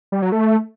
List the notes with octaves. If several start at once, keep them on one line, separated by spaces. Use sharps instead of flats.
G3
F#3
A3